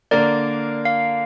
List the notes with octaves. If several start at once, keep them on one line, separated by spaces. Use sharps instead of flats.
D3 A#3 D4 A#4 D5
F5